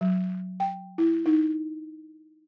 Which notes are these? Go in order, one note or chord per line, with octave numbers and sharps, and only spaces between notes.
F#3
G5
E4
D#4